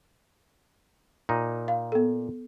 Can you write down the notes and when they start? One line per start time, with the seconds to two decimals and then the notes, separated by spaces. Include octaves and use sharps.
1.29 A#2 D#4
1.68 F5
1.92 B3 A4